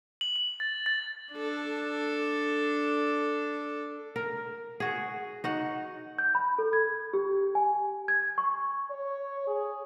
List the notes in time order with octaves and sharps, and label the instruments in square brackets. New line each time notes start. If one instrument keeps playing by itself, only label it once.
[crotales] F#7
F#7
A6
A6
[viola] D4 A4
[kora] A#4
F#4 G#4
D#4 F#4 F#5
[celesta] G6
B5
A4
G#6
G4
G#5
G#6
C#6
[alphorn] C#5
G#4